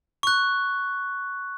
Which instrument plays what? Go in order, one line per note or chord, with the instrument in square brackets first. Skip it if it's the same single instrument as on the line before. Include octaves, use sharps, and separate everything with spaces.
[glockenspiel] C#6 F#6